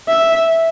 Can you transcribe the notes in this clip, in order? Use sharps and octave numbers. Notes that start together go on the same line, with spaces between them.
E5